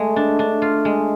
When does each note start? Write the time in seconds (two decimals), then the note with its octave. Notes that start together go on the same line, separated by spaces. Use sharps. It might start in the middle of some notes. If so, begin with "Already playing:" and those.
Already playing: G#3 A3
0.16 D4
0.39 D4
0.62 F4
0.85 G#3